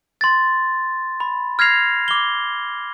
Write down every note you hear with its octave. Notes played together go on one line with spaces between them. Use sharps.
C6 A6
B5
F6 G#6 A#6 C7 F7
D6 G7